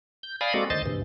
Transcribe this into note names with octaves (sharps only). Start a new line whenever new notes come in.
G6
D5 F5 G#5 B5 D#6
G#3 A#3 C4 F#4 A4 D5
D2 D#3 C5 D#5 A6
D2 G2 C3 E3